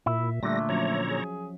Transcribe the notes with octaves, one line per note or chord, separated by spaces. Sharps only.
A#2 E4 E5
A#2 D3 G3 A3 A#6
F3 F#3 C#4 C#5 A#5
G#4